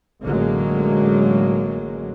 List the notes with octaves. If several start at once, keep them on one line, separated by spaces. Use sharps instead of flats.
A1 D3 F#3 G#3 A#3